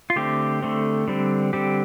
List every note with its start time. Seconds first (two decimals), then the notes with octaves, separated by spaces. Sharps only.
0.10 F4
0.16 D3 A3 C4 G4
0.63 D3 A3 C4
1.08 D3 G3 C4
1.53 D3 G3 C4 G4